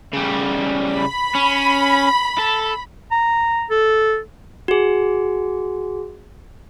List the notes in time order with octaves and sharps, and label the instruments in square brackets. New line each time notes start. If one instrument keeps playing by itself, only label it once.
[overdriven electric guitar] C#3 G3
[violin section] B5
[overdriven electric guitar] C#4
A4
[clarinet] A#5
A4
[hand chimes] F#4 G#4